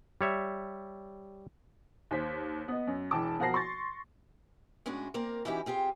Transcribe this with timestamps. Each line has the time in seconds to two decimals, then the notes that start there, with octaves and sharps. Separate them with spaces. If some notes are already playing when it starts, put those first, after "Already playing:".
0.21 G3 C#5 E5
2.11 D#2 C5 B6
2.68 B3 D#5
2.87 F#2
3.11 E1 E3 G5 A5 D6
3.39 B2 F3 F#4 A#4 A#6 C7
3.54 C6 C#6 A6
4.86 A2 G#3 C#4 D4 F#4
5.14 A#3 C4 A#4 D5
5.45 E3 C#4 D#4 E4 F#4 G4
5.66 C4 F4 G4 G#4